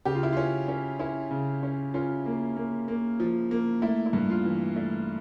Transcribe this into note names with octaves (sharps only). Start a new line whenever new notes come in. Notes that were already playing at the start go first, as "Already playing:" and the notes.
C#3 G4
F4
E4
C#4 F4
C#4
C#4 E4
C#3
C#4
C#4 F4
A#3
A#3
A#3
F3
A#3
A3 E4
E4
G2
F4
E3
A3